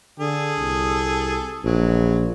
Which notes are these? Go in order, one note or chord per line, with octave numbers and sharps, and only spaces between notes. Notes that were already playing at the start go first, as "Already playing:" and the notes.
D3 G#4 A4
C2
A#1 F#3